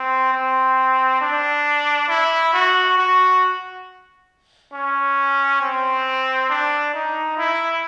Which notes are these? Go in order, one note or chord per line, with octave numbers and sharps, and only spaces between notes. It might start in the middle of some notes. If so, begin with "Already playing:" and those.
Already playing: C4
C4
D4
E4
F#4
F#4
C#4
C4
D4
D#4
E4